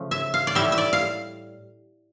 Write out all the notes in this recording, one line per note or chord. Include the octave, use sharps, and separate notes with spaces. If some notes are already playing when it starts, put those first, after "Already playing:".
Already playing: C#3 F3 A3
E5
F5
D5
A2 G3 E5
E5
D5
F5